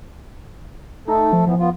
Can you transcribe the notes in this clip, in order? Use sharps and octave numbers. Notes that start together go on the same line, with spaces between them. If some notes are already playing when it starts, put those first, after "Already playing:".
A3 D#4 A4
F3
A2 E3 F3 B3
B3 F4